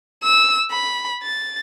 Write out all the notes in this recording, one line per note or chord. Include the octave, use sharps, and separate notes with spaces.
E6
B5
A6